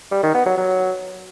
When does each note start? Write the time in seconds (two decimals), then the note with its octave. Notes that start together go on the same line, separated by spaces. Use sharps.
0.11 G3
0.23 D#3
0.34 B3
0.46 F#3
0.57 F#3